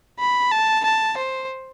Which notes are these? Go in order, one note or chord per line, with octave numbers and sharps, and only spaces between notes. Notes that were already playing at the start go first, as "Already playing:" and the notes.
B5
A5
A5
C5